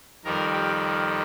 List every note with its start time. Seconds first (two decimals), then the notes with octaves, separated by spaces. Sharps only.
0.24 F2 D#3 G3 A#4
0.53 G4